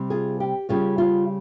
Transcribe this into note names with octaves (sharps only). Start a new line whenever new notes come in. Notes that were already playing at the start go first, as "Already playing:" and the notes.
Already playing: C3 G3 C4
F4 G#4
G4
C#3 G3 C#4 F4 G#4
F4